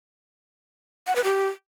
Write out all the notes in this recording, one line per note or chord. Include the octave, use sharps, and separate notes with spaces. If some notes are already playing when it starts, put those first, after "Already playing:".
F#5
B4
G4